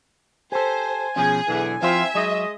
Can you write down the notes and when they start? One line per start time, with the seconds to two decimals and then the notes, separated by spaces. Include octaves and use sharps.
0.52 G4 A4 C5 G#5
1.16 B2 F3 C#4 G#4
1.48 B1 E2 D3 E3
1.82 F3 C4 E4 F4 C5 E5
2.15 F#3 G#3 D#5